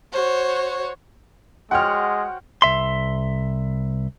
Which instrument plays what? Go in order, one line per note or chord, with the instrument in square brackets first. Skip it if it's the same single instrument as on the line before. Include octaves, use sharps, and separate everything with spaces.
[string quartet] F#4 C5 C#5
[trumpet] G#3 [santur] F#4 C5 C#5 [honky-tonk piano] F#5 G5 F6
[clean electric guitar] C2 E5 C6